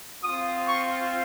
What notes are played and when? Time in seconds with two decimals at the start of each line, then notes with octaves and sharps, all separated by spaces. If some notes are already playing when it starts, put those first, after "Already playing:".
0.24 C4 F4 D#6
0.67 C#6